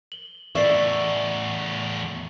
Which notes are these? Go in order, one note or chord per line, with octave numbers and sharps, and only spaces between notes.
F#7 G7
E2 A2 D5 E5 C#6 C7